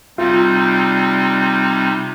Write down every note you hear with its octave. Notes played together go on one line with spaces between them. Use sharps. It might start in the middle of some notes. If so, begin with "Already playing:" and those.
C3 G3 C4 D#4 F4